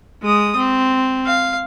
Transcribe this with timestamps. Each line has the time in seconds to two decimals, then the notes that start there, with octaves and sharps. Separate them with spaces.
0.22 G#3 D#6
0.56 C4
1.27 F5